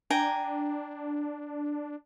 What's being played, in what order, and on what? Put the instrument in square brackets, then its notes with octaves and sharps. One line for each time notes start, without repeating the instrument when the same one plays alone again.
[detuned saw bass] D4 [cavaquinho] G5 G#5 A#5